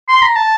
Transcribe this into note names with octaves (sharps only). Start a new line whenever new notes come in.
C6
A#5
A5